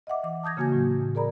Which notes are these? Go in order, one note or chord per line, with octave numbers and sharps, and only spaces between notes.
D#5 E5 F#5 D6
E3 D6
A5 D#6 G6 G#6 A#6
C#3 A#3 F#4 G#5 G#6
A2 F#3
G#4 A#4 D5 A#5 B5